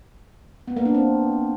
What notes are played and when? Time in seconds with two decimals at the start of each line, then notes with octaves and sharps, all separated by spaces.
0.68 B3
0.77 A#3
0.85 D4
0.94 C4